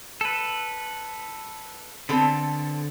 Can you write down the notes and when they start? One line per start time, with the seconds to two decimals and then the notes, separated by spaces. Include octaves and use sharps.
0.21 A4 B4
2.09 D3 B3 C4 A4